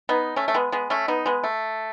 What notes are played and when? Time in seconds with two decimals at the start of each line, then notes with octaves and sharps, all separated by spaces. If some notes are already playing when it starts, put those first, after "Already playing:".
0.09 B3 D#4
0.36 A3 C#4
0.48 A3
0.54 G#3 B3
0.72 G#3 B3
0.90 A3 C#4
1.08 B3 D#4
1.26 G#3 B3
1.44 A3